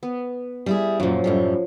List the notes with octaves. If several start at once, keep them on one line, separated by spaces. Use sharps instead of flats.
B3
G3 E4 G#4
F#2 A#2 F3 F#3
F#2 A2 G3